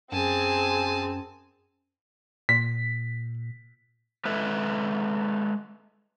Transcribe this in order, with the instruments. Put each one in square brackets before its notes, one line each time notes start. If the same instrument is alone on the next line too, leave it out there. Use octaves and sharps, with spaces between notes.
[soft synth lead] F#2 [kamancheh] C4 G#4 [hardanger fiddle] G#5 A5
[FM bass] A#2 [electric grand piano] B6
[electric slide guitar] G#3 A4 B4 E5